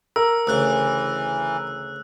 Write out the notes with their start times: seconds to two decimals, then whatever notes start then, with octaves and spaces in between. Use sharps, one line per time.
0.16 A#4 E6
0.47 D2 C#3 E3 E6 F#6